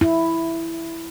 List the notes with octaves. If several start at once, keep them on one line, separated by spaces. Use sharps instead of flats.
E4